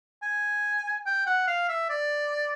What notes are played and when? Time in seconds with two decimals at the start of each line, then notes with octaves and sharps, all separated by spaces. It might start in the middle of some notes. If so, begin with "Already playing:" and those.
0.23 G#5
1.06 G5
1.27 F#5
1.48 F5
1.69 E5
1.90 D5